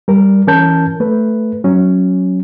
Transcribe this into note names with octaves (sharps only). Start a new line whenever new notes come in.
G3 A#4
E3 C#4 A#4 A5 G6
A3 B4
F#3 C#4